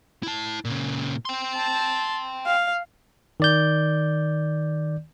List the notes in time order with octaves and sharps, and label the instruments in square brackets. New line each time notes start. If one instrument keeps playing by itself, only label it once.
[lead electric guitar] E4 A5
A#2 C#3
G5 C6
[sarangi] A5
F5
[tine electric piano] D#3 D5 G6